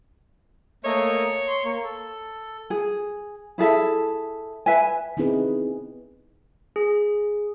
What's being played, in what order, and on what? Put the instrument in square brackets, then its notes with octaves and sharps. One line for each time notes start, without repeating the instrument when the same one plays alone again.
[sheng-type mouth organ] A3 A#3 D#5 [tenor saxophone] C#5
[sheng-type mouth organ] C6 C#6
A#3
A4
[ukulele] G#4
E4 G#4 A4 E5
B4 E5 G#5
[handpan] B3 C4 D#4 E4 G#4 B4
[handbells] G#4